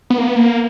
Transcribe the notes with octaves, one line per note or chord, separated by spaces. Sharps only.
B3
A#3
B3
A#3